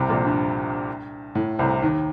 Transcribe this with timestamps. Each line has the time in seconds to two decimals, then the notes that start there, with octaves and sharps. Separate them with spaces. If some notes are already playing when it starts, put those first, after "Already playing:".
Already playing: C2 C3
0.09 A#1 A#2
0.25 G2
1.35 A2
1.59 C2 C3
1.82 D#2 D#3